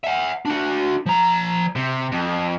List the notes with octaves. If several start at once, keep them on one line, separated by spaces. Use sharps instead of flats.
E5 F#5
D4 F#4
F3 A#5
C3
F2